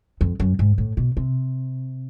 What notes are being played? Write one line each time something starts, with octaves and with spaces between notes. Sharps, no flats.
F2
F#2
G#2
A2
B2
C3